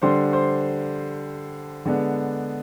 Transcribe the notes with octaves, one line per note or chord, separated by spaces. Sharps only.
D3 G3 D4 C5 C6
C5 C6
D3 G#3 B3 D4